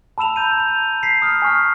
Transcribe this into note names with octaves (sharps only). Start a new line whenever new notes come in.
A5 B5 E6 E7 F7
A#5 G6 D#7
F7
B6 C7
D#6 F6
G#5 C#6 F6